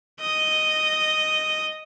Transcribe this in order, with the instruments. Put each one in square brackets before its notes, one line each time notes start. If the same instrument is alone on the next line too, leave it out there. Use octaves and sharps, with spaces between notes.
[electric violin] D#5